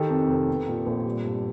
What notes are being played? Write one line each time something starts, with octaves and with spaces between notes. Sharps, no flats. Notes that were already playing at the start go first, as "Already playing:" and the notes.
Already playing: D#3 G4 A4
F2
F1
B3
A#2
A#1
G3
G2